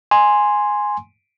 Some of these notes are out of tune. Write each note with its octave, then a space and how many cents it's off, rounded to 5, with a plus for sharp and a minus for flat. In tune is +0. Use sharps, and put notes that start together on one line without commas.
G#5 +0 C6 +0